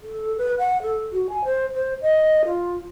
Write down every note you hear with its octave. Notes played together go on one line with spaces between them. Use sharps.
A4
B4
F#5
A4
F#4
G#5
C5
C5
D#5
F4